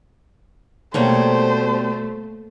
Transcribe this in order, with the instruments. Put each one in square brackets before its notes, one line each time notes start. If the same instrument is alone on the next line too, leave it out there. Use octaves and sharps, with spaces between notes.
[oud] B2 G3 [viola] A3 [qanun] A#3 C#5 [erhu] C5